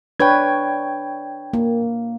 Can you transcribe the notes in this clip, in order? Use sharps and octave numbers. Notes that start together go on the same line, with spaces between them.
D4 B4 C#5 G5 G#6
A#3